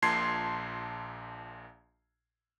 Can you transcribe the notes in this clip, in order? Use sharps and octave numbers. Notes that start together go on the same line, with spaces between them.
A#1 A#2 A5 C6 G#6 C7